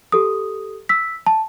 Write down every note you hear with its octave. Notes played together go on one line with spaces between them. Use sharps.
G4 A4 D#6
E6 B6
A5